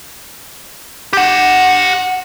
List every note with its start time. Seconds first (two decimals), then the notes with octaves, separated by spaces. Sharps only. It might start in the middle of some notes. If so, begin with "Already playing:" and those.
1.13 G4 F#5